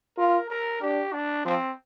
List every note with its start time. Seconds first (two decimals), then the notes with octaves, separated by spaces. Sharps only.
0.18 F4 A#4
0.50 A#4
0.81 D4 G4
1.13 D4
1.45 F3 C4